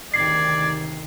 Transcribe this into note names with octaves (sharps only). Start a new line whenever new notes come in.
D2 C3 D#3 D5 G#6 C7